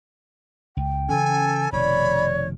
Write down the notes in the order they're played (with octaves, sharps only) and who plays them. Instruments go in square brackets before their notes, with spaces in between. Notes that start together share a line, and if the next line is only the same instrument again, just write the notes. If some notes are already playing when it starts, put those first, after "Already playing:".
[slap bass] C#2 [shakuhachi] G5
[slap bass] C#3 E3 C#4 [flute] A4 [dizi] G#5
[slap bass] F1 B2 D#3 [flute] C#5 [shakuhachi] D5 [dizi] B5